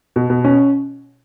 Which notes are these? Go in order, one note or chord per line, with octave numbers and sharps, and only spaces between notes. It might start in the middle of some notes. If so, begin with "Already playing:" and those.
B2
B2
C#4